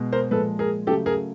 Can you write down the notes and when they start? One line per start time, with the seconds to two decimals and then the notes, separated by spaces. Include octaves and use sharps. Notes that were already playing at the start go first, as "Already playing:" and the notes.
Already playing: B2 G#3
0.13 A#4 C5
0.31 A#2 F3 G#3 A4 B4
0.59 G#4 A#4
0.87 C#3 F#3 A3 G4 A4
1.06 G#4 A#4